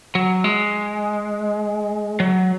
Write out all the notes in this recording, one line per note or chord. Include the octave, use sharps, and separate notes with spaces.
F#3
G#3
F#3